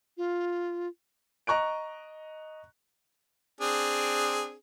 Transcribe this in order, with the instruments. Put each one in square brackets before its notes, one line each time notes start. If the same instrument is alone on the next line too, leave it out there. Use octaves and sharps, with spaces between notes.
[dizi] F4
[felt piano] D#5 A#5 C#6 F#6 D7
[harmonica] C4 D4 G#4